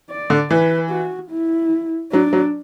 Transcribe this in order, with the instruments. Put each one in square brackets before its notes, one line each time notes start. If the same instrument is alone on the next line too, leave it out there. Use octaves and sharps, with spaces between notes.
[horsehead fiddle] D5
[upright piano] D3
[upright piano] E3 [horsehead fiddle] B4
[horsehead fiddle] F#4
E4
[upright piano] F#3 [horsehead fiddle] D4
[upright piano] F#3